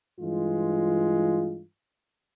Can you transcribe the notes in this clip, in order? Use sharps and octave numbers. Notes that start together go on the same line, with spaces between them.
G2 E3 G#3 F4